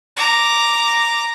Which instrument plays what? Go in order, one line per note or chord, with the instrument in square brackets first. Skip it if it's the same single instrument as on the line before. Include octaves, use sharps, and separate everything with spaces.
[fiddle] A#5 D6